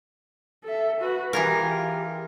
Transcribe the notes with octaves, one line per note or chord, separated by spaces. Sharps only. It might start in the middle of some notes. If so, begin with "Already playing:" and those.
A4 E5
F#4 B4
E3 F4 G4 G#4 A#4